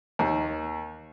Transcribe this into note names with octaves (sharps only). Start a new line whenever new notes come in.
D#2